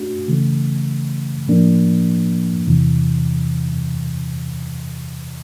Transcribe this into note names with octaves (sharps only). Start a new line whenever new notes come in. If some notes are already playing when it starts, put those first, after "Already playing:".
Already playing: A3 D4 F#4
C#3 E3 A3
A2 F3 A#3 D4
E2 C3 E3